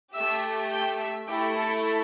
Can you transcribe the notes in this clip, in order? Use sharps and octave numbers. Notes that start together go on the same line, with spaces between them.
A3 G4 E5 E6
G5 G6
E5 E6
A3 E4 G4 A4 G5
A4 A5